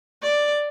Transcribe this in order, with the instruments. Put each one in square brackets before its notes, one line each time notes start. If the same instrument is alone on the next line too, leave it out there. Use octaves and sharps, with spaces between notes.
[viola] D5